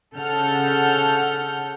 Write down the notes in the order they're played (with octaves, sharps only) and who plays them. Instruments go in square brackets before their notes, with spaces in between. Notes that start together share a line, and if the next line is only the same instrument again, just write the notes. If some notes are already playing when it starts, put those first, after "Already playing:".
[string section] C#3 A4 F#5 F6 G6